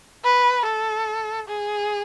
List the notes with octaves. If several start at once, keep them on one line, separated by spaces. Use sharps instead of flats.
B4
A4
G#4